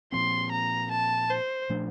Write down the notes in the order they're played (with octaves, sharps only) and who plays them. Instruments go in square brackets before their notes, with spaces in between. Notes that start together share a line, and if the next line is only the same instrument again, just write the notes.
[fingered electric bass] A#2 F3 C4 [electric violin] C6
[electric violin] A#5
A5
C5
[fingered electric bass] A#2 F3 A3 D4